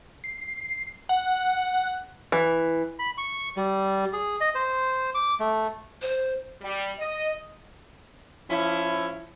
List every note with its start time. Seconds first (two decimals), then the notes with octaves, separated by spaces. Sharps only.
0.24 C7
1.09 F#5
2.32 E3
2.99 B5
3.18 C#6
3.57 G3
4.13 G#4
4.41 D#5
4.55 C5
5.15 D6
5.40 A3
6.02 C5
6.62 G3
6.99 D#5
8.50 F3 C#4 E4